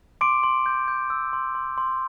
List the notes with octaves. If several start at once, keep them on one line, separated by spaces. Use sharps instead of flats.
C6 D6 D7
C6
G6
G6
E6
C6
C6
C6